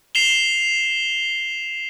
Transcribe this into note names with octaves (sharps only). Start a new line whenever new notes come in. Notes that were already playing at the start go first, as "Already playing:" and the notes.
C7 E7 F7 G7